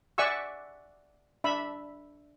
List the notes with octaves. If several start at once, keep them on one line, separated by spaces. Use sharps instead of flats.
D5 E5 F#5 G#5 C#6 E6
D4 E5 B5